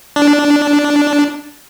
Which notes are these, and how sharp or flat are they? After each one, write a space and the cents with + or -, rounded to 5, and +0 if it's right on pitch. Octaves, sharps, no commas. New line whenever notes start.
D4 -5